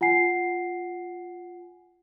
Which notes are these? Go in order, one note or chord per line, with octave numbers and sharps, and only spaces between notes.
F4 F#5 G#5 C7